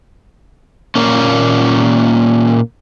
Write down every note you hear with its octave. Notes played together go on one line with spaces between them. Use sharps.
A#2 A#3 C#4